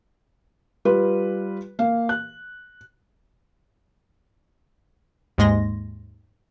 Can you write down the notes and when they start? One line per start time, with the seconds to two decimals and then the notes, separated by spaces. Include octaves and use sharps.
0.85 G3 F4 B4
1.79 A#3 F5
2.09 F#6
5.38 D#2 G#2 G#3 C6 A#6